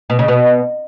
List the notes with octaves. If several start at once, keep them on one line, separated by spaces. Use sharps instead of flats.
B2
C#3
B2